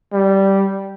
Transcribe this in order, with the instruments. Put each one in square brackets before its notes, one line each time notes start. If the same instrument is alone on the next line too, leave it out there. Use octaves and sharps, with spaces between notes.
[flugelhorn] G3